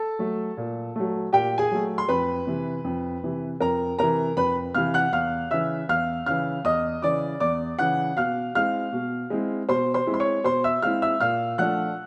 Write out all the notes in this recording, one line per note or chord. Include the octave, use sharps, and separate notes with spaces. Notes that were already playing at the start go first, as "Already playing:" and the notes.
Already playing: A4 A5
F#3 A3
A#2
F#3 A3
A#2 G4 G5
G#4 G#5
F#3 A3
C6
F2 B4 B5
C3 E3
F2
C3 E3
F2 A#4 A#5
C3 E3 A#4 A#5
F2 B4 B5
C3 E3 F5 F6
F#5 F#6
E2 F5 F6
C#3 E3 E5 E6
E2 F5 F6
C#3 E3 F5 F6
E2 D#5 D#6
C#3 E3 D5 D6
E2 D5 D6
C#3 E3 F#5 F#6
B2 F5 F6
G#3 C4 E4 F5 F6
B2
G#3 C4 E4
B2 C5 C6
C5 C6
G#3 C4 E4
C6
C#5 C#6
B2 C5 C6
E5 E6
G#3 C4 E4 F5 F6
E5 E6
A#2 F5 F6
F3 A3 D4 F4 F#5 F#6